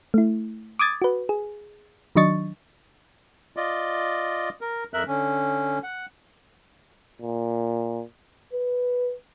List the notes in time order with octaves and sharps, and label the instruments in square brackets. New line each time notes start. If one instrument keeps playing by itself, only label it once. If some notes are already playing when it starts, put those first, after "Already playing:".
[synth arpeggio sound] A3 E4
D6 D#6 G#6 A6
F#4 B4
G#4
D#3 F#3 D4 D#5 C#6 A6
[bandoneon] F4 D5 D#5
A#4
F2 A#4 E5 F#6
D3 C#4
F#5
[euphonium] A#2
B4